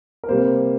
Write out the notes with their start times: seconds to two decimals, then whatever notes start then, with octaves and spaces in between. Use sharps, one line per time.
0.24 A#4
0.28 C3 G3 A#3 C5